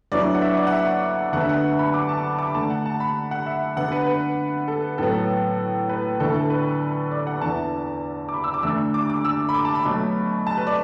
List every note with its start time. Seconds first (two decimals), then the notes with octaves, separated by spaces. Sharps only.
0.12 D2 D3 F#3 B3 E4 D5
0.35 F#5
0.42 E5
0.57 D5
0.67 F#5
0.72 E5
1.32 D2 D3 B3 F#5
1.41 E5
1.49 F#5
1.79 B5
1.94 D6
2.09 A5
2.38 D6
2.47 B5
2.54 D3 A3 D4 A5
2.70 F#5
2.86 A5
3.00 B5
3.31 F#5
3.46 E5
3.77 D3 B3 D4 F#5
3.92 B4
4.07 B4
4.68 A4
4.98 A2 F#3 B3 A4
5.89 B4
6.20 D2 D3 B3 E4 A4
6.35 A4
6.50 B4
7.11 D5
7.27 F#5
7.41 E2 D3 B3 E4 A5
8.29 D6
8.34 B5
8.44 E6
8.54 D6
8.63 D2 D3 A3 D4 E6
8.94 D6
9.10 D6
9.25 E6
9.49 B5
9.54 D6
9.65 A5
9.75 B5
9.85 B2 F#3 A3
10.47 A5
10.58 B4
10.67 D5